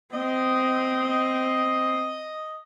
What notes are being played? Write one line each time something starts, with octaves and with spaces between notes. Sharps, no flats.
C4 D#5